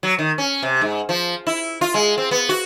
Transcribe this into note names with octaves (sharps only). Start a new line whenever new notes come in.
F#3
D#3
C#4
C3
G#2
F3
E4
F4
G#3
C4
B3
F#4